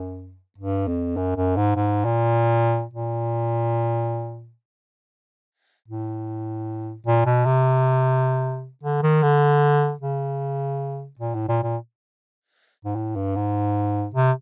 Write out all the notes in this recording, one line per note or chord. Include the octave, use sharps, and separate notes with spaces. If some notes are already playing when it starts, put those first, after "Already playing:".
Already playing: F#2
G2
F2
F#2
F#2
G#2
G#2
A#2
A#2
A2
A#2
B2
C3
D3
D#3
D3
C#3
A#2
A2
A#2
A#2
G#2
A2
G2
G#2
C3